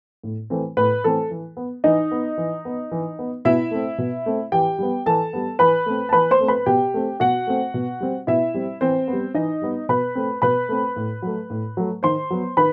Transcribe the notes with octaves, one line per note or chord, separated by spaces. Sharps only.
A2
E3 A3 C4
A2 B4
E3 A3 C4 A4
E3
B3
E3 D#4 D#5
B3
E3
B3
E3
B3
B2 E4 E5
A3 C4
B2
A3 C4
E3 G4 G5
G3 B3
E3 A4 A5
G3 B3
E3 B4 B5
A3 C4
A5
E3 B4 B5
C5 C6
A3 C4
B4 B5
B2 G4 G5
A3 C4
B2 F#4 F#5
A3 C4
B2
G3 C4
B2 E4 E5
G3 C4
E3 C4 C5
G3 B3
E3 D#4 D#5
G3 B3
B2 B4 B5
A3 C4
B2 B4 B5
A3 C4
A2
F#3 A3
A2
F#3 A3
D#3 C5 C6
F#3 B3
D#3 B4 B5